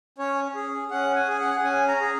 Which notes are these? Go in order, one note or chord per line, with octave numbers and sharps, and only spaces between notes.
C#4 C#5
G#4
C#4 F#5
G#5
G#4
F#5
C#4 G#5
A#5
G#4